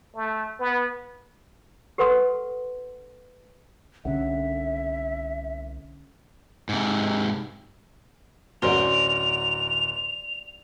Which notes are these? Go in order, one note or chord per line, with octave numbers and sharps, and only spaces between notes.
A3
B3
G4 A4 B4 F#5 C6 D#6
C2 D3 C#4 E5 F#5
G#2 C3
D1 C#4 F#4 A#4 C5 D5 F#5 F7